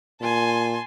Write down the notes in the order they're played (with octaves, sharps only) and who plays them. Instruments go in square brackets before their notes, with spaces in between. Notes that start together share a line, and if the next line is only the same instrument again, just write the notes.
[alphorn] A#2 [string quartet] G#5 A5 C6